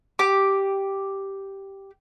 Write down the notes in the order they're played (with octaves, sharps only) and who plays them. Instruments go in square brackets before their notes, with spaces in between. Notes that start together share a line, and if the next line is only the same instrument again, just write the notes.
[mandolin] G4 D6